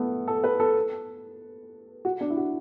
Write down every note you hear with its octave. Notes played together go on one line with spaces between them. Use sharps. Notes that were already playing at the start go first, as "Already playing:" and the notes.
Already playing: A3 B3
A4
B4
A4
F#4
D4
E4
F#4